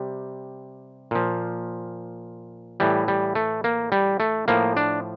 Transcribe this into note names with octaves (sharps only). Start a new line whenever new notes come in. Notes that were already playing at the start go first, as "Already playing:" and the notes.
Already playing: C3 G3
A#2 F3
A2 E3 G3
G3
A3
A#3
G3
A3
A2 F3 A#3
D4